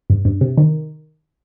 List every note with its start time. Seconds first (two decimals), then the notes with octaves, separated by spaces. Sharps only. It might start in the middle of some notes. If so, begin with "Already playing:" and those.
0.10 G2
0.25 G2
0.41 C3
0.58 D#3